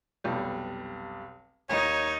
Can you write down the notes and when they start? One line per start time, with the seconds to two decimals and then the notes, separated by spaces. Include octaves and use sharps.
0.24 F1 B1 G3
1.69 D#2 D#4 A#4 C#5 A#6